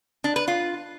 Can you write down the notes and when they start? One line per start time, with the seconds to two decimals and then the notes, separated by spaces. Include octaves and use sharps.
0.24 D4
0.36 B4
0.48 F4